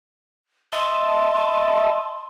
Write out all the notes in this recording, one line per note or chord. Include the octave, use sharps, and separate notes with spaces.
D#5 E5 A5 C6